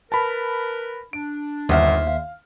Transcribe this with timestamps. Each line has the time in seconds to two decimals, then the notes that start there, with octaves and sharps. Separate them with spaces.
0.12 A#4 B4 A5 B5
1.13 D4 D7
1.69 G1 D#2 C5 E5 F#5 F6
2.07 F5